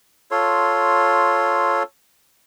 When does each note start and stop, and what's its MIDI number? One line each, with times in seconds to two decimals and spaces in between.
0.31 1.83 65
0.31 1.83 69
0.31 1.83 73
0.31 1.83 84